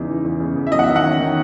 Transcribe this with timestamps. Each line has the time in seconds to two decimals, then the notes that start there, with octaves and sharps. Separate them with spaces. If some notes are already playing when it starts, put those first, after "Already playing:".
Already playing: E2 C#3 D#4
0.09 E3
0.24 E2
0.40 C#3
0.56 E2
0.67 E5
0.72 F#3 D#5
0.79 F#5
0.84 D#3 E5
0.96 F#5
1.04 C#4
1.20 D#3